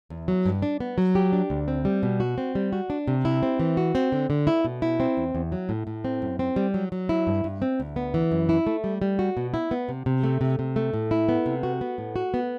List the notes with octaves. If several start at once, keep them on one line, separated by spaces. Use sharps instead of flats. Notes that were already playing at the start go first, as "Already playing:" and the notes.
E2
F#3
G2
D4
B3
F#3
G4
D4
D2
C4
G3
B2
F#4
C4
G3
F#4
D4
C3
E4
C4
E3
F#4
C4
D3
D3
E4
B2
E4
C4
E2
E2
F#3
A2
A2
C4
F#2
C4
G3
F#3
F#3
E4
G2
G2
C4
D2
B3
E3
F#2
E4
A3
G3
G3
F#4
B2
E4
B3
C3
C3
A3
C3
C3
A3
A2
E4
B3
C3
F#4
B3
A2
F#4
B3